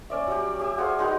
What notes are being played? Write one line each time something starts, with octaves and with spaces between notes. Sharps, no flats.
C#4 D5 E5
F#3 G4
G4 E5
F#4 G#4 C5 F5
G#3 D#4 F#4 B4